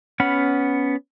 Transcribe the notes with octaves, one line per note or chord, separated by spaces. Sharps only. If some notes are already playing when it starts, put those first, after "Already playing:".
B3 C#4 F#5 B5 F6